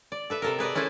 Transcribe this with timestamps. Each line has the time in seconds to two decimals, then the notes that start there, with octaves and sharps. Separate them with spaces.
0.12 D5
0.30 A4 B4 E5
0.42 C3 A4 A#4
0.59 G#4 B4 D5 D#5
0.75 C#4 E4 A4 B4 C5